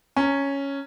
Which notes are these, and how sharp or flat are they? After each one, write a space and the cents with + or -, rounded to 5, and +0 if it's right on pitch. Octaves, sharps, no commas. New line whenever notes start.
C#4 +0 A#5 -35